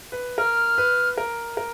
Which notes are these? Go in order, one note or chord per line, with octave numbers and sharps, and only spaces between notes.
B4
A#4 F6
B4
A#4
A#4